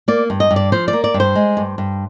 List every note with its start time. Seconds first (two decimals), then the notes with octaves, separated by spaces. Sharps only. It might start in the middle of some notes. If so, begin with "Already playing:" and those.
0.08 A#3 D5
0.30 G2
0.40 D#5
0.51 G2
0.56 D5
0.72 F3 C5
0.88 D5
0.93 A#3
1.04 D5
1.14 G2
1.20 C5
1.35 G#3
1.57 G2
1.78 G2